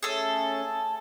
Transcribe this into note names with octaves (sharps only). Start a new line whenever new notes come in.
A3 C#4 G#4 A4